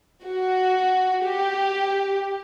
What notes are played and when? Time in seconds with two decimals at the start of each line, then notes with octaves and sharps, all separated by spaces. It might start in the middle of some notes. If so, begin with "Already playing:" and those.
0.24 F#4
1.24 G4